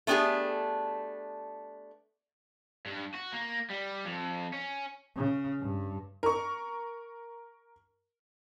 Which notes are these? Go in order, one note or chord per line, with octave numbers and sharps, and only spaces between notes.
A3 B3 D4 G4 G#4
G2
F#4
A#3
G3
F2
C#4
C#3
G2
A#4 C#6